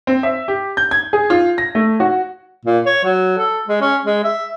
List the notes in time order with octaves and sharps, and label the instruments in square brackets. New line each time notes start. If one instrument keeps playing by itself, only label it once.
[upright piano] C4
E5
G4
G6
G#6
G#4
F4
A#6
A3
F#4
[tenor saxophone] A#2
C#5
F#3
A4
G#3
C#4
G#3
E5